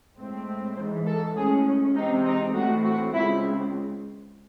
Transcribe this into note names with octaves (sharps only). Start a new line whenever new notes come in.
A2 G#3 C4
G#2 E3 G#3 C5
A4
A2 G#3 C#4 G#4
C3 E3 G#3 C4 D#4
D#4
A2 E3 A3 C4 F#4
F#4
C#2 C#3 G#3 C4 E4